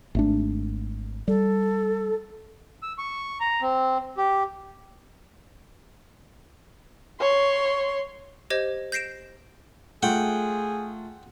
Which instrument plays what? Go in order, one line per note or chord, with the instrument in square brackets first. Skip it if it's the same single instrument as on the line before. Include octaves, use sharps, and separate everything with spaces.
[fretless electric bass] G#1 A3 D4
[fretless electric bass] G3 [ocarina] A4
[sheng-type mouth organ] E6
C#6
A#5
C4
G4
[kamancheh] C#5 C6
[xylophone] G4 C5 D#5 G#6
G6 A#6 C7 D7 E7
[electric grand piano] A3 F4 [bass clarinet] G#4 [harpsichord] F#5 G5